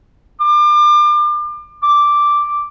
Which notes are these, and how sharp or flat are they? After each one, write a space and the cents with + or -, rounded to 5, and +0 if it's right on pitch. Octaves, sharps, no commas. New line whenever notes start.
D6 +35
D6 -5